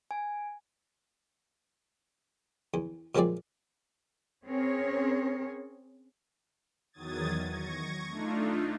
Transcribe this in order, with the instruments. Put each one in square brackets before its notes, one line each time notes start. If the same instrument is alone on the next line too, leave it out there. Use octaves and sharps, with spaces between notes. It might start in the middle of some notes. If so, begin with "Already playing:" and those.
[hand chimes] G#5
[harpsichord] E2
A#2 F3 F#3 G#3 C4 D5
[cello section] C4 C#4 G#4 A#4 C#5
[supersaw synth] E2 D#3 F#3 D#6 G#6 A6
C#6 G#6 A#6
A3 D4 D#4 F4